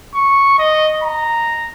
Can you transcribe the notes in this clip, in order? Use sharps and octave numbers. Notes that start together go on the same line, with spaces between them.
C#6
D#5
A#5